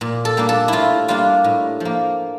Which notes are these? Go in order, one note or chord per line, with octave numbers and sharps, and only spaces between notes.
A#2
A4
G3 A#3 D4
A4
A2 E4 F4
G3 A#3 D4 F4
A2
F3 A#3